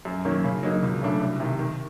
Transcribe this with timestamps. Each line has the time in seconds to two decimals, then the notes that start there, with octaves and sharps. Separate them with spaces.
0.05 F#2
0.25 D#3 F#3 A#3 C#4
0.44 C#3
0.63 F#3 A#3 D#4
0.83 C#2
1.01 C#3 F#3 A3 D4
1.21 C2
1.40 C3 D#3
1.59 D#3